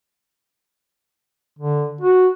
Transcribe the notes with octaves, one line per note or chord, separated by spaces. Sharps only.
D3
F#4